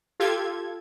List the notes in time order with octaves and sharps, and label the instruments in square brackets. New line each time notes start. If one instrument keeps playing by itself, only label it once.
[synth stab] F4 G4 A4 G#6